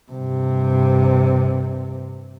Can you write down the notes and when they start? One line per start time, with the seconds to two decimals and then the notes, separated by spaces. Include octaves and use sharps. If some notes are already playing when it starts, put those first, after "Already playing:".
0.12 G2 C3